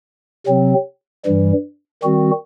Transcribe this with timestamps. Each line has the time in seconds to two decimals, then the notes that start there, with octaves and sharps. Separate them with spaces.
0.47 C3 F#3 C4
1.25 G2 E3 G3
2.03 D#3 G3 C4 F#4